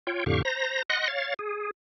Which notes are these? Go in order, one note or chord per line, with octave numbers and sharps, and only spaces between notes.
F4 C#5 G5
F2 A2 D3 G4 F5 C#6
C5 A#5 A#6
D#5 F#5 C6 F#6 A#6
C#5 F5 A6
G#4